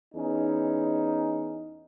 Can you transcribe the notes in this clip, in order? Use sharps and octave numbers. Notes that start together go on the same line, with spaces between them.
E2 C#4 D#4